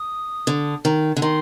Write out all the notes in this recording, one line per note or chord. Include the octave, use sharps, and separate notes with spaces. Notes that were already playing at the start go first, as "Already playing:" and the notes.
Already playing: D#6
D3
D#3
D3
D#3 C6